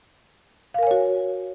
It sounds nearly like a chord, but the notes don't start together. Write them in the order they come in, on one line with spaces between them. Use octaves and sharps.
F5 A#4 G#5 C#5 F#4